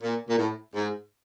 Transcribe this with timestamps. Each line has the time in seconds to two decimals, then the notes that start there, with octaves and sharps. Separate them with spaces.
0.01 A#2
0.29 A#2
0.37 A2
0.75 G#2